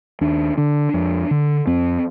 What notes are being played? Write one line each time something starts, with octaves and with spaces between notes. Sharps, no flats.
D#2 D4
D3 D4
F2
D3
F2 C4